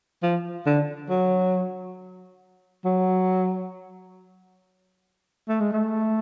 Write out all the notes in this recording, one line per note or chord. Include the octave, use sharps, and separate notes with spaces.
F3
D3
F#3
F#3
A3
G#3
A3